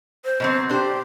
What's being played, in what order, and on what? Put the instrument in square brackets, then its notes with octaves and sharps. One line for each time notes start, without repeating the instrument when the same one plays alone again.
[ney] C5
[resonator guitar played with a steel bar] B2 F#3 C4
[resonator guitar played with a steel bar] D4 C5 [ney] G4